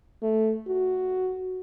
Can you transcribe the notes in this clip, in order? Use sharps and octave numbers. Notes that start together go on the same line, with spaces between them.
A3
F#4